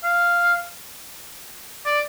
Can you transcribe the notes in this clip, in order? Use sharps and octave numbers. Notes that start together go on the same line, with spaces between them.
F5
D5